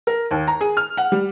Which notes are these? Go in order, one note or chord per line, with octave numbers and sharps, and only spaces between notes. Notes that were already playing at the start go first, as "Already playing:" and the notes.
A#4
D#2
A#5
G#4
F6
F#5
G3